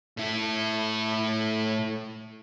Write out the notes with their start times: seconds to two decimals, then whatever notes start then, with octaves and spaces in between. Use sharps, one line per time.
0.17 A2 E4